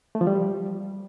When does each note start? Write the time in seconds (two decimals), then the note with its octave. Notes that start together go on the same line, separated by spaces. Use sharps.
0.15 A3
0.21 F3
0.27 G3